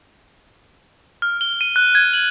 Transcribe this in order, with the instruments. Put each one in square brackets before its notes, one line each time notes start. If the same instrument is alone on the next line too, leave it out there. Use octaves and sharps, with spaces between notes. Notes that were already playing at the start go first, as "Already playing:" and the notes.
[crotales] F6
G7
D#7
F#6
G#6
F#7